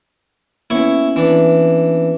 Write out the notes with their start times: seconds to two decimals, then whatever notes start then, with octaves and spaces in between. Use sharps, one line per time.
0.70 A#3 B3 C#4 E4 C#5
1.16 E3 D4